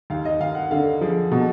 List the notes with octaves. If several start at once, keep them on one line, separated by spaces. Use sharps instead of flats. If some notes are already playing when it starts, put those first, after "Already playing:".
D#2 F5
D#5
D#2 F5
F#5
D3 F5
F3 G#4
B2